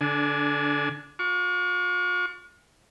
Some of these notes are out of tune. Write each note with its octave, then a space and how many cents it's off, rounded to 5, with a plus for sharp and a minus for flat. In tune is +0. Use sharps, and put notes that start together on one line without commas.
D3 -25 D4 +0 G#5 +25
F4 +45 C#6 +45